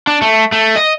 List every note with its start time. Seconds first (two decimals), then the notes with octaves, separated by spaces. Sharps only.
0.07 D4
0.22 A3
0.52 A3
0.76 D#5